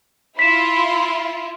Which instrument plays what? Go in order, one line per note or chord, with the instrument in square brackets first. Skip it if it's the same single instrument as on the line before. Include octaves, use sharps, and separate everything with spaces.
[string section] E4 F4 [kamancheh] B5 C6 [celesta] B6 E7